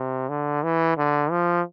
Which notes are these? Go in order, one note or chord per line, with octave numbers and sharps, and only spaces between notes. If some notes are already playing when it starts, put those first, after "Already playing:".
Already playing: C3
D3
E3
D3
F3